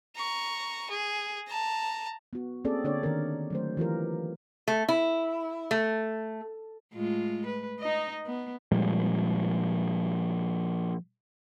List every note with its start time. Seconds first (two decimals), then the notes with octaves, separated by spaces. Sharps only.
0.16 A#5 C#6
0.90 G#4
1.48 A5 A#5
2.33 B3 F#4
2.65 A#3 C4 C#4 G#4 A4 D5
2.84 D3 A#3 D4 C#5 D5
3.03 D#3 A#4
3.50 F#3 A3 C5
3.77 E3 F4 G4 A#4
4.68 A3
4.88 E4
5.71 A3
6.93 A2 G#3 F4
7.46 B4
7.79 D#4 D#5
8.26 B3
8.72 A#2 F3 G3 G#3